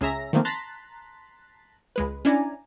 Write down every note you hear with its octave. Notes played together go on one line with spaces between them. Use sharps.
C#2 C#4 G#4 E5 A#5 A#6
D#3 F3 A3 A#3 C4
A5 A#5 C6 F#6 A6 B6
C#2 G#3 B4
C#4 D4 E4 D5 G#5 A#5